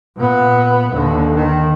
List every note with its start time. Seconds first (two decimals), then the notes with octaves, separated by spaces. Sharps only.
0.17 A#2 B3
0.92 D#2 D3
1.35 D#3